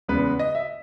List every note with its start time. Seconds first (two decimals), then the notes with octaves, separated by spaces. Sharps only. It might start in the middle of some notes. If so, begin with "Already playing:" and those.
0.08 E2 C#3 G#3 B3 B4
0.39 D#5
0.55 E5